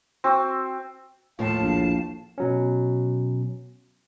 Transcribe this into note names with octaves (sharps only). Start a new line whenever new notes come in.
C4 F#4
D#2 A2 F3 F5 A5
A#1
B2 F#3 C#4